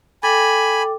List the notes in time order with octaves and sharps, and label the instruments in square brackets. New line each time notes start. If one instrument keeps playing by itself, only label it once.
[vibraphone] A4 G5 D6 [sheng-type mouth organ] G#5 B5